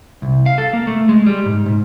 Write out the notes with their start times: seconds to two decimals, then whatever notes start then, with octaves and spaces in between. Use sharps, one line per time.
0.22 C2
0.46 F5
0.58 A4
0.73 A#3
0.87 A3
1.09 G#3
1.27 G3
1.46 G#2
1.66 G#2